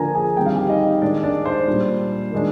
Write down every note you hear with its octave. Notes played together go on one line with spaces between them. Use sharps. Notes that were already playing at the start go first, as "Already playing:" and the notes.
Already playing: D3 F3 A#3 D4 A#4 G#5 A#5
G#4 G#5
D#3 G3 C4 G5
F5
G4 G5
D#4 D#5
D#3 G#3 D4 D5
D4 D5
C5
A#2 G3 D4
D#3 G#3 D4